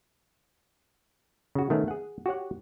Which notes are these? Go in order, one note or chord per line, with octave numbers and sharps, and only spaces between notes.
C#3 F#4
D#3 A3 B3 C#4
G#4 F#5
F#4 G4 C#5 F#5